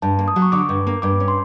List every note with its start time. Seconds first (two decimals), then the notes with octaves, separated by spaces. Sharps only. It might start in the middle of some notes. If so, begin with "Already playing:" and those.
0.02 G2 A5
0.19 A#3
0.28 D#6
0.36 F#3
0.42 C#6
0.52 D3 D6
0.69 G2
0.87 A#3
1.02 G2 D6
1.20 C#4
1.28 C6